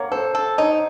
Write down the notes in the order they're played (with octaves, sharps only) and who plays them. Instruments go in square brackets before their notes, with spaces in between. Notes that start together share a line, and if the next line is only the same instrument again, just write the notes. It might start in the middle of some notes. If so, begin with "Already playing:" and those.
Already playing: [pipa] A#3 [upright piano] C#5 F#5
[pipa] A4 [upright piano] C5
[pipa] A4
[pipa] D#4 [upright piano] C#5